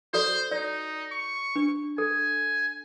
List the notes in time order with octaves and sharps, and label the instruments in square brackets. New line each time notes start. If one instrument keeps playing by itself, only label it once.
[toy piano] F#4 A4 D5 [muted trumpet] C5
[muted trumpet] D#4 [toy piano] D5
[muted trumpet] C#6
[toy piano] D4
[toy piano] A4 [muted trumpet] G#5